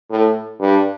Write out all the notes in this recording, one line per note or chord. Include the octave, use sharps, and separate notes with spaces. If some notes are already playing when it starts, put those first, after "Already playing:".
A2
G2